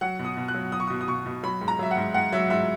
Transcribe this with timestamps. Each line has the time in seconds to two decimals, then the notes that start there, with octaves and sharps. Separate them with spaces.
0.01 F#3 F#5
0.19 B2
0.25 D#6
0.37 B2
0.48 F#6
0.55 F#3
0.72 F#3 D#6
0.80 C#6
0.87 B2 D#6
1.01 D#6
1.08 B2 C#6
1.26 B2
1.43 F#3 B5
1.61 G#2
1.68 A#5
1.79 F#3 E5
1.91 F#5
1.97 G#2
2.14 G#2 F#5
2.32 F#3 E5
2.50 G#2 E5